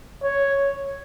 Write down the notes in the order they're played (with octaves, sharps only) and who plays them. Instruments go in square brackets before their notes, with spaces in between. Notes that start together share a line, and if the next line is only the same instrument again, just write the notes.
[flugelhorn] C#5